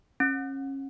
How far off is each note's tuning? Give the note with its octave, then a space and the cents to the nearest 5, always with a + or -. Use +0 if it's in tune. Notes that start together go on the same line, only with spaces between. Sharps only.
C#4 -30